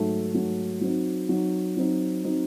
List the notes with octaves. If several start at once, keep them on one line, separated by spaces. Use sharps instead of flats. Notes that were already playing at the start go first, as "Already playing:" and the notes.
Already playing: G#2 F#3 A3
G#2 F#3 A3
F#3 C4 D#4
F#3 C4 D#4
F#3 C4 D#4
F#3 C4 D#4